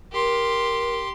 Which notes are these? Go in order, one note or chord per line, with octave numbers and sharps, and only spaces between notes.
G4 A#4 C6